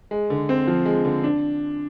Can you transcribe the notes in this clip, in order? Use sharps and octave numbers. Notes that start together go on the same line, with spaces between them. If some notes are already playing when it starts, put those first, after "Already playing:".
G#3
D3
C4
F3
G#3
D3
D4